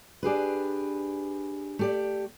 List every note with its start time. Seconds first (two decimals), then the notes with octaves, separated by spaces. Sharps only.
0.23 D4 G4 G#4 B4
1.79 A3 G4 D5